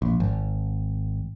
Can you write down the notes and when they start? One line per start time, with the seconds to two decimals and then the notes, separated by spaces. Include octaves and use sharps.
0.02 A#1
0.20 G#1